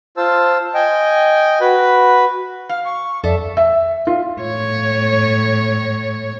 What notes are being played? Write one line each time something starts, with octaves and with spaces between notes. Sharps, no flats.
F4 C5 A5 E6
D#5 G5 G#5
F#4 B4 B5
F5 F6
C#6
F2 A4 D5 E5
E5
F4
A2 C#5